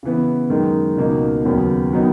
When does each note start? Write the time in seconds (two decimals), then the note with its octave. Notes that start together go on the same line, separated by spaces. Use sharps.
0.03 C#3 E3 B3
0.50 F#2 D#3 G#3 D#4
0.97 C#2 B2 A#3 D#4
1.45 D#2 C#3 F#3 B3
1.93 D#3 F#3 B3 D#4